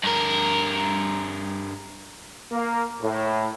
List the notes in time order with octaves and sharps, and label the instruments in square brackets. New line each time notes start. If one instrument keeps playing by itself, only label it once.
[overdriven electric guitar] G2 A#4
[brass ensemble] A#3
A2